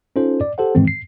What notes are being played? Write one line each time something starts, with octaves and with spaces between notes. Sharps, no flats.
C#4 D#4 F4 A4 C5
D5
G4 A4 C5 F#5
G#2 D#3 E3 G#3 C4
C7